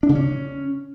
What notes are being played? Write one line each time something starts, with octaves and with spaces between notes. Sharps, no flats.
D4
C#3
C#4